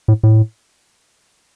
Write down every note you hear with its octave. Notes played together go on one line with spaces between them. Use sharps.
A2
A2